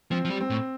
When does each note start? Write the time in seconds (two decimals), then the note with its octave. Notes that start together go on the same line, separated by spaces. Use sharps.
0.11 F3 C4
0.25 F3
0.30 G3
0.41 C4
0.50 A2